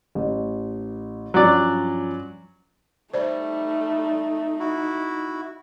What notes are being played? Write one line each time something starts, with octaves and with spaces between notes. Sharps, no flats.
A1
G2 F3 F#3 C#4 D5
G3 A3 D#4 C5 D5
E4 F#4